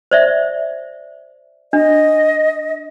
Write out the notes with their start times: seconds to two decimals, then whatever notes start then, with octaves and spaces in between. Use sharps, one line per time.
0.11 C5 D5 E5
1.73 D4 D#5